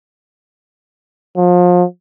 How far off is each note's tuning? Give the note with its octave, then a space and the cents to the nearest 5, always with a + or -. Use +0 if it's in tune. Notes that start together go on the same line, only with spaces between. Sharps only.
F3 +30